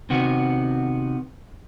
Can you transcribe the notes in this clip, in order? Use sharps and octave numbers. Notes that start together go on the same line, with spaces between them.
C3 D#3 B3 F#4